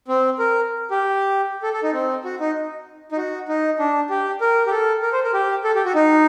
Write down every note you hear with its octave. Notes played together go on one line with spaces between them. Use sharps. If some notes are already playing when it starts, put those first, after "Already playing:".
C4
A#4
G4
A4
A4
D#4
C4
F#4
D#4
D#4
F#4
D#4
D4
G4
A#4
G4
A4
A#4
C5
A#4
G4
A4
G4
F#4
D#4